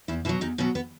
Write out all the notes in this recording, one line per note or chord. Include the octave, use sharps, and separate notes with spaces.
E2 E4
B2 F#3 E4
E2 D#4
B2 F#3 C#4
B3